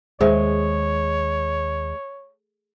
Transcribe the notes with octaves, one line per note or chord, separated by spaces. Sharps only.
D#2 G#3 G#4 C5 C#5 E5